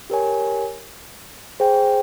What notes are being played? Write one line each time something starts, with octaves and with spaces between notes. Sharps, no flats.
G4 A#4 C#5 G#5
G#4 C5 G5